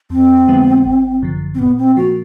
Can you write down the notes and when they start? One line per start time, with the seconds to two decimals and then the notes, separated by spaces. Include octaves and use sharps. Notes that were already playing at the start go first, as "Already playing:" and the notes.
0.10 F2 C4
0.48 D3 F3 G#3 B3
0.85 G#1
1.22 F#2 D3 F3
1.55 C4
1.59 A#2 B3
1.78 C4
1.97 F3 A#3 F#4